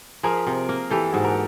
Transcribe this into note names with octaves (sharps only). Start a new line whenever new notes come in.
F3 G#4 A#4
C3
A#3
E3 G4 A4
G#2 F#4 G#4
A#4